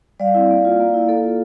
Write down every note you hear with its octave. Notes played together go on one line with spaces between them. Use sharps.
G3 D5 F5
C4 E4
A#3
F4
A#3
E4
A#3 A4
F4